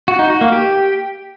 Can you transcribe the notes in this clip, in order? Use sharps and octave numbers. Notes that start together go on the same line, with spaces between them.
F#4
D#4
F#4
A#3
G4